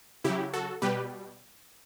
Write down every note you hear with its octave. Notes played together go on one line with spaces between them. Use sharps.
C#3 F#3 E4 G4
F#4 A4
B2 G3 G4 B4